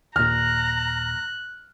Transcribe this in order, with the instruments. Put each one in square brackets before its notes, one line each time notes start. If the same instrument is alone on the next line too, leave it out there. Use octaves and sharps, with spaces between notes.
[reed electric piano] D#2 A#2 [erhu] A#5 [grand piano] F6 [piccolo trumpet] F#6